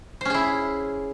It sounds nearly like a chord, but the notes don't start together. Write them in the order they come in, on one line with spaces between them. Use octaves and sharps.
C5 C#4 G#4 E4